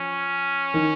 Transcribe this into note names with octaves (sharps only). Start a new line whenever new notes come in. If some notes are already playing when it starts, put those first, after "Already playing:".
Already playing: F3 C#4
D#3 D#4